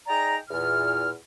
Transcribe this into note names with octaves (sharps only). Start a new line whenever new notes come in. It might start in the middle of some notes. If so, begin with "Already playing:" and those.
D#4 G#4 D5 G5 A#5
E2 A#2 F6